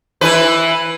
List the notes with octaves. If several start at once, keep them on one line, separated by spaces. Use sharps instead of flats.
E3 B4